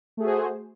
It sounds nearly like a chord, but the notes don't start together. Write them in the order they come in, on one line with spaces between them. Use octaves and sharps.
A3 G#4 F#4 C5